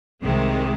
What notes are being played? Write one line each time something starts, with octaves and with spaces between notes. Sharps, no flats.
C2 C3 D#3 G#3